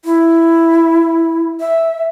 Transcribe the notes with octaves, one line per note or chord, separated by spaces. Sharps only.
E4
E5